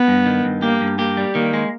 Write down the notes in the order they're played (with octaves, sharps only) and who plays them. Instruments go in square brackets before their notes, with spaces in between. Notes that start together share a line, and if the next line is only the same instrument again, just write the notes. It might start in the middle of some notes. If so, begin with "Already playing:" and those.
Already playing: [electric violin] B3
[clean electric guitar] G2
D#3
G2
[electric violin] A#3 [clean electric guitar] G4
[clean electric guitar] G2
[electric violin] A#3 [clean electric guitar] G4
[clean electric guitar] G3
[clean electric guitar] D#3 [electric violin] A#3
[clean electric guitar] G#3